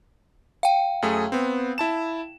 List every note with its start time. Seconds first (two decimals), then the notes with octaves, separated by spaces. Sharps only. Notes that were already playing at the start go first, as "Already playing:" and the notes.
0.63 F5 G5
1.02 F#2 A3 G#4
1.32 B3 C4
1.78 E4 A5 E7